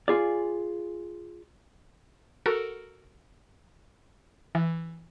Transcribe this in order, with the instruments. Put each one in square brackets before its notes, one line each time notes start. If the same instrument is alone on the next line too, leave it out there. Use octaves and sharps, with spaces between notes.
[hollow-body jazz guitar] F4 G#4 D5
[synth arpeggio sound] F#4 A4 A#4
E3